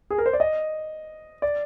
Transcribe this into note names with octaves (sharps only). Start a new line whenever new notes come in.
G#4
A#4
C5
D5
D#5
D5